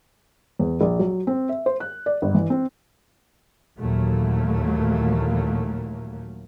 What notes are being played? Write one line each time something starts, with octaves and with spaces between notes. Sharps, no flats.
E2
A#1
F#3
C4
E5
C5
F#6
D5
G1
E3
C4
D#2 A#2 E3 F#3 A3 A#3